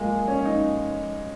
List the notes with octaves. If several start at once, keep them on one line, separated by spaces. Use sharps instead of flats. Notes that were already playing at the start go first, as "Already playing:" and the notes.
Already playing: F3 G#3 A#3
C#4
D#4